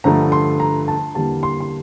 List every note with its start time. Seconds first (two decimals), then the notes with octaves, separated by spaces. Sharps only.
0.04 G2 D3 F3 A3 A#5
0.32 C6
0.60 A#5
0.88 A5
1.15 E2 D3 G3 A#3 A5
1.43 C6
1.60 C6